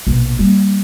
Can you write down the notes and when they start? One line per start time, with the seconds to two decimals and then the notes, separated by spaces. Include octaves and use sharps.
0.07 A#1 B2
0.39 G3 A#3